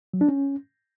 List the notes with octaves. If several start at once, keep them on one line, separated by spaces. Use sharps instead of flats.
F#3
D4
C#4